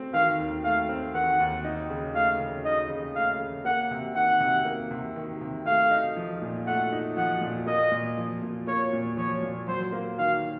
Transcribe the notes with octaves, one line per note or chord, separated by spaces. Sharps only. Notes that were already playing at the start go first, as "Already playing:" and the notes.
Already playing: A3 C4
D#3 F5
D#2
A3 F5
C4
D#3 F#5
D#2
D#4
C#3
A3 F5
C#3
D#4 D#5
C#3
A3 F5
C#3
A#3 F#5
C3
D#3 F#5
C3
A#3
C3
D#3
C3
A3 F5
D#4
F3
A#2
A3 F#5
D#4
F3 F#5
A#2
A#3 D#5
A#2
F3
A#2
A#3 C#5
A#2
F3 C#5
A#2
F#3 C5
A#3
D#3 F5